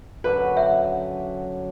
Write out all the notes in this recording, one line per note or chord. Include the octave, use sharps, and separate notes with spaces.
F#2 D3 F#3 B4
E5 F#5